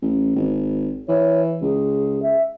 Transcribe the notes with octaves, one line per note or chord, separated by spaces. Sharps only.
A1
G#1
E3 C#5
C#2 G#4
E5